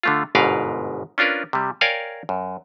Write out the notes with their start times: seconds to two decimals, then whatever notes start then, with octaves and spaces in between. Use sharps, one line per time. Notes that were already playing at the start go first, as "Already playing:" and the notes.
0.03 D3 A3 F4
0.35 G1 G#2 B2 A#4 B4 F5
1.18 C#4 D4 F4 A#4 B4
1.53 C3 G3
1.81 A#4 C#5 D5 F5 G5 G#5
2.29 F#2